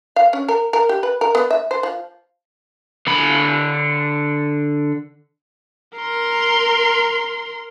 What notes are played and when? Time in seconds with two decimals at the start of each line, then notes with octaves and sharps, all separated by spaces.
0.16 F5
0.33 C#4
0.48 A#4
0.73 A#4
0.89 G4
1.03 B4
1.21 A#4
1.35 B3
1.51 E5
1.71 C5
1.83 F3
3.07 D3 B5
5.97 A#4 C6